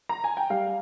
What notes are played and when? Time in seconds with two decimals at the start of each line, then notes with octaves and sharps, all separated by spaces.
0.09 A#5
0.24 G#5
0.37 G5
0.50 G3 F5